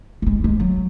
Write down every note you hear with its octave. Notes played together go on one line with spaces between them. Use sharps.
A3
G#3
G#3
F#3